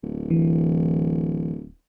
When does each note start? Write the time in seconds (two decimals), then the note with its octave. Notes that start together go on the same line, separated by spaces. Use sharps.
0.03 D1
0.30 E3